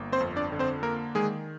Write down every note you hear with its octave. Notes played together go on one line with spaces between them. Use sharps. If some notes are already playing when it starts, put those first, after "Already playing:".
Already playing: G1 A#3
C4 C5
F2
D4 D5
D3
C4 C5
A#3 A#4
D#3 G#3 G#4